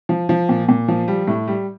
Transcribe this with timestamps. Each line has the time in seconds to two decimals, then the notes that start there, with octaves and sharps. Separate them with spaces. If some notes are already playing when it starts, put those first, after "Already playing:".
0.09 F3
0.29 F3
0.49 A#2
0.69 A#2
0.88 F3
1.08 G3
1.28 A2
1.48 G3